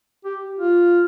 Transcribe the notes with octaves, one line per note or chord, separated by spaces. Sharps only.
G4
F4